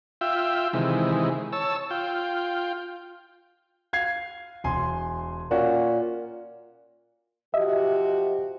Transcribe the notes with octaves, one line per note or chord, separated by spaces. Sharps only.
F4 E5 G5
C3 D#3 E3 G#3
C#5 A5 E6
F4 G5
F5 G#6 C7
E1 G#5 C6
A#2 C#4 F#4
F3 F#4 G4 D#5 E5